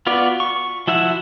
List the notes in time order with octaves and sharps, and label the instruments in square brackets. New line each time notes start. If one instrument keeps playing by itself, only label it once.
[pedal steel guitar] B3 F4 F#4 D5
C#6
F3 E4 F#4 E5 F#5